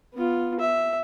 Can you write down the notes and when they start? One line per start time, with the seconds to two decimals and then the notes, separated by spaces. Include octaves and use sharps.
0.15 B3 F4
0.60 E5